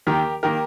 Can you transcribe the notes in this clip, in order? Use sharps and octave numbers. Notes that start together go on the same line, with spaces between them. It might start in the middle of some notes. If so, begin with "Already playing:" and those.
D#2 D#3 A#3 G4 A#4
D#3 A#3 G4 A#4